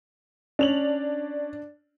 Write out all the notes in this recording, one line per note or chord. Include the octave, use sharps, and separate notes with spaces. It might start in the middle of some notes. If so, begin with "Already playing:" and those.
C#4 D4 F7 F#7